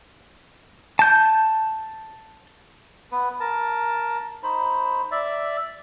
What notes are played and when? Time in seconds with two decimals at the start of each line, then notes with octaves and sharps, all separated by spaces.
0.99 A5 G6
3.12 B3 B4
3.40 A#4 A5
4.43 D#4 C5 B5
5.11 D5 E5